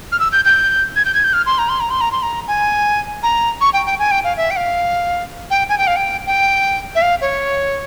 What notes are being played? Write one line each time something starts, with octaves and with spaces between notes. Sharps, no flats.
F6
E6
G6
G6
G#6
G6
G#6
G6
F6
C6
A#5
C6
A#5
C6
A#5
C6
A#5
G#5
A#5
C#6
G5
G5
G#5
G5
F5
E5
G5
F5
G5
G#5
G5
F5
G5
G5
E5
F5
C#5